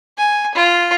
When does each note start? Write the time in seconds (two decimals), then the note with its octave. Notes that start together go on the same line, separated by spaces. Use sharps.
0.18 G#5
0.54 F4